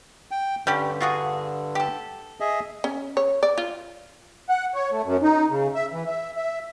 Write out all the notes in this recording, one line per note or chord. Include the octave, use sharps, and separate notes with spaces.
G5
G2 D3 G3 C#4 G4
F4 F#4 G#4
G4 A4
G#4 D#5 E5
C#4
C#5
D5
F4
F#5
C#5
A3
F#2
D#4
C#3
E5
E3
E5
E5